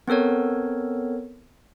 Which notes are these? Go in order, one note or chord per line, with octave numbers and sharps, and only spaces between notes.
B3 C4 A4 A#4 C#5